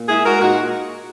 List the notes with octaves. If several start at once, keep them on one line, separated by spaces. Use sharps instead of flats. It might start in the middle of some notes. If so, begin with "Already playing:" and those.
Already playing: A#2
G#3 E4 G#4
G#3 F#4 A#4
A#2 D#4 F#4